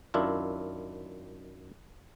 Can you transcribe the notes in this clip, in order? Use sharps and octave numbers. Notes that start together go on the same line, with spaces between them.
F#2 D#3 D4 E4 F4